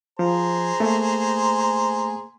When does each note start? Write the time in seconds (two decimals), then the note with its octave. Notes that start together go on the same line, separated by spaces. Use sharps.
0.19 F3 G#4 C5 A#5
0.80 A3 A#3